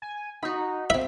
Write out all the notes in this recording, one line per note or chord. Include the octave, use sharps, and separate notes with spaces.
G#5
D#4 F#4 B5
C4 E5 B5